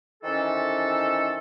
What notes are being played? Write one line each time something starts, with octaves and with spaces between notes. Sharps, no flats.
C3 D#3 E3 C#4 A4